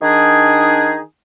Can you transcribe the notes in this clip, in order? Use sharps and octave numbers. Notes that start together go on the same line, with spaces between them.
D#3 D4 D#4 G#4